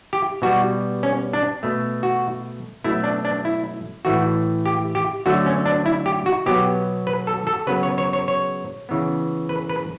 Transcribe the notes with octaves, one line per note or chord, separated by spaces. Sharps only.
G4
B2 G3 B3 F#4
C#4
D4
B2 A3
F#4
B2 F#3 A3 E4
D4
D4
E4
A2 E3 A3 F#4
G4
G4
D3 F#3 A3 F#4
C#4
D4
E4
G4
F#4
B2 F#3 B3 G4
B4
A4
A4
C#3 F#3 B3 B4
C#5
C#5
C#5
C#5
C#3 E3 B3
B4
B4